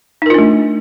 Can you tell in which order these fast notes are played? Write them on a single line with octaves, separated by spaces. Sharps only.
D#4 A#4 F4 D4 A3